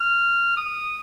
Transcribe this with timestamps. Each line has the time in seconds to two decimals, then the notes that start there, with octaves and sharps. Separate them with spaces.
0.01 F6
0.57 D#6